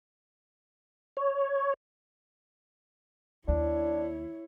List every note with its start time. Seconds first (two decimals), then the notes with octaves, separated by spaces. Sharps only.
1.17 C#5
3.48 D#2 D4 E4 C#5